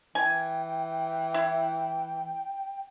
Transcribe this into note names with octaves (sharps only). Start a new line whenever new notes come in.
E3 G5 G#5
E4